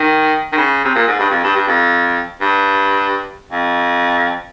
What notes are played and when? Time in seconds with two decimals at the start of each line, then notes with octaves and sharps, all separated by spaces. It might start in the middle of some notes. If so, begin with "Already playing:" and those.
Already playing: D#3
0.52 D#3
0.57 C#3
0.85 C3
0.95 A#2
1.08 G#2
1.19 G2
1.30 F2
1.43 G2
1.55 G2
1.67 F2
2.41 G2
3.52 F2